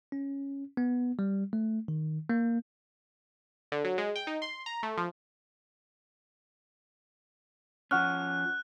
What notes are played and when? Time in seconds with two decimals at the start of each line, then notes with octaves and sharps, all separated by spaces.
0.12 C#4
0.77 B3
1.19 G3
1.53 A3
1.88 D#3
2.29 A#3
3.72 D3
3.84 F#3
3.98 G#3
4.16 G5
4.27 D#4
4.42 C6
4.66 A#5
4.83 A3
4.98 F3
7.91 F3 C#4 F#5 C#6 F6 F#6